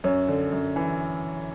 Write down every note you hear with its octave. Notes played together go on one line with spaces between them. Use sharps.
F#2 C#4 C#5
D3
F#2
E3